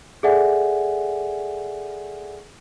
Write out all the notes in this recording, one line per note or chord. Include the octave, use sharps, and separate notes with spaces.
G#4 A4 D5 E5 F#5 G#5